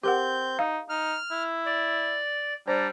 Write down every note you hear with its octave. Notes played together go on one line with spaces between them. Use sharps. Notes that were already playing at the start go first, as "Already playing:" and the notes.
C4 G4 A#4 F#5 G6
D#4 F5
D#4 F6
E4
D5
G3 D4 C5 A#5